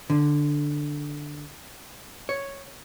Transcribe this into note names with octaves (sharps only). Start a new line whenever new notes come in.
D3
C#5